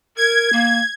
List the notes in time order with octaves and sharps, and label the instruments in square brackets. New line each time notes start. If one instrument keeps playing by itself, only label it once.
[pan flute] A#4 [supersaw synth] G#6
[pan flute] A#3